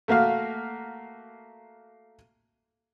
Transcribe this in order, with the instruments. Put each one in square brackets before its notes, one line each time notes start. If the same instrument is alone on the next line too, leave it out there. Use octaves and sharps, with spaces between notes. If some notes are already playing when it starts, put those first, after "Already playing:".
[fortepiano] A3 A#3 F#4 F5